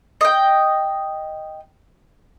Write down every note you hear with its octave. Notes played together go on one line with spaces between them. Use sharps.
D#5 G5